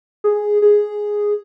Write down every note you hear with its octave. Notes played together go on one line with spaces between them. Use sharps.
G#4
G#4